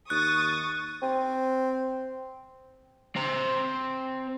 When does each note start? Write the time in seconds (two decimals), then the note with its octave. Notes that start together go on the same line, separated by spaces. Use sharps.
0.10 D#2 C#6 D#6 F#6 A6
1.02 C4
3.16 C4 A#5